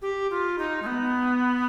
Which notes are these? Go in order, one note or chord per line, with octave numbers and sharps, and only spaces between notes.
G4
F4
D#4
G#3
B3